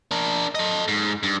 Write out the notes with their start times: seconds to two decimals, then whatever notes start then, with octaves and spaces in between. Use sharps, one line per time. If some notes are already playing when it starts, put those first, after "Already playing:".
0.11 D4 A#4
0.55 A4 D#5
0.88 G#2
1.23 G2